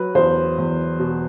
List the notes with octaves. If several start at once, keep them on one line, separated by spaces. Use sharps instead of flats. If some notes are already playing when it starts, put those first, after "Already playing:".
Already playing: F#3 B4
E2 C5
E2
B2